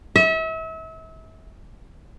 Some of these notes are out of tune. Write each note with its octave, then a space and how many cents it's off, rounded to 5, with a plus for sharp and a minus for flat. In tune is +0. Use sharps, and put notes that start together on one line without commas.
E5 -35